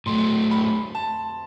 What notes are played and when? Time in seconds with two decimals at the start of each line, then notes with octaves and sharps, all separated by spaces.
0.06 A2 F#3 A3 C6
0.51 B5
0.95 A5